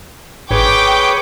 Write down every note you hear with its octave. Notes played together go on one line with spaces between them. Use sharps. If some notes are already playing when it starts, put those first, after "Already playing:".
G#1 G#4 B4 C#5 G5 D6